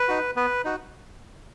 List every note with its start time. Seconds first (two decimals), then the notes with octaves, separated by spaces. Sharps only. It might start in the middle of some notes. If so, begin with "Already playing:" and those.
Already playing: B4
0.08 D#4 F#4
0.36 B3 B4
0.64 D#4 F#4